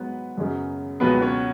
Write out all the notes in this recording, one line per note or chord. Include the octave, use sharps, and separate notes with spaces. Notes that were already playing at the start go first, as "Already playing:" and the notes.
Already playing: G#2 F#3 B3 B4
F#2 C#3 F#3
C#2 B2 F#3 B3 B4
C#4 C#5